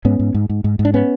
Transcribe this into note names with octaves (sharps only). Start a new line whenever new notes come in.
G#2 B3 C#4
G#2
G#2
G#2
G#2
G#2
D4
B3 C#4